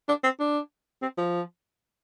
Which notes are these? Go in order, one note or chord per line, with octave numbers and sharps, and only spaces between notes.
D4
C4
D4
C4
F3